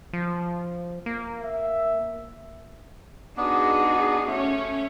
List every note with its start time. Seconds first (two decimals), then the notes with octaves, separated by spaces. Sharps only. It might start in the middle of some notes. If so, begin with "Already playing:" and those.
0.13 F3
1.06 A#3
1.43 E5
3.37 B3 D4 D#4 F#4 G#4
4.27 A3 C#4 C#5